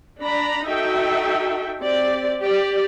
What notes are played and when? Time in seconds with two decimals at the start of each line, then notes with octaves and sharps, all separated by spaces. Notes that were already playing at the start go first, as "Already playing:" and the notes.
0.21 D4 A#5 B5
0.66 D#4 F#4 A4 E5 G5
1.79 C4 G4 D5
2.41 G4 D5